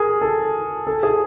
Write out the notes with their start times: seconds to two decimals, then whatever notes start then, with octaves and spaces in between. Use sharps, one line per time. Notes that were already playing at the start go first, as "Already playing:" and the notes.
Already playing: G#4 A#4
0.21 A4
0.87 A4
1.03 G#4